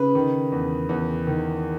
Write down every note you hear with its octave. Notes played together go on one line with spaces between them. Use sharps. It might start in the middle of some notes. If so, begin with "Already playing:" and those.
Already playing: C#3 B4
D#3
E2
E2
D#3